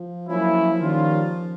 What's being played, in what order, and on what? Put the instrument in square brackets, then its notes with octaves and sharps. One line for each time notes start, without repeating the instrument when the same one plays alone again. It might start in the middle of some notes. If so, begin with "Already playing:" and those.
Already playing: [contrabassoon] F3
[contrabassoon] F3 [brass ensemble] F#3 A#3 C#4 E4
[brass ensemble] D#3 G3 A#3 C#4 F4